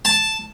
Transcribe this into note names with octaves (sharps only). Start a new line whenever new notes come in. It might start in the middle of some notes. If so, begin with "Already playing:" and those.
A5